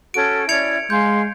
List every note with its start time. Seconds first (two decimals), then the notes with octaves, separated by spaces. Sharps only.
0.14 C#4 F#4 A4 D7
0.49 C#4 E4 D5 G#6 C#7 F7
0.90 G#3 F5 G#5 C6 G6